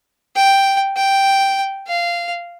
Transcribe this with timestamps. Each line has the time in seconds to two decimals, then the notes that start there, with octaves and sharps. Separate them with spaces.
0.36 G5
0.97 G5
1.87 F5